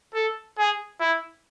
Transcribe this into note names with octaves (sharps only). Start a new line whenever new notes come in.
A4
G#4
E4